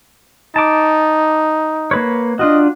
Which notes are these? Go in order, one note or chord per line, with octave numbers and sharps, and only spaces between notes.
D#4 A5 D6
A#3 B4 C#5
D4 F4 F#4 D#5